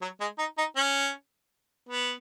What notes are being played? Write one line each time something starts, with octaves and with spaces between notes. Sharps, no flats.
F#3
G#3
D#4
D#4
C#4
B3